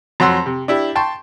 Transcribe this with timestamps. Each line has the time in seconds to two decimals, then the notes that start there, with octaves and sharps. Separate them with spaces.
0.20 F2 F#3 F#5 C6 E6
0.46 C3
0.68 D4 E4 G4
0.95 G5 A5 C6 C#6